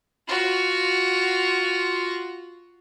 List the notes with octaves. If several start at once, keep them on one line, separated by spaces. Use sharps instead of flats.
F4 F#4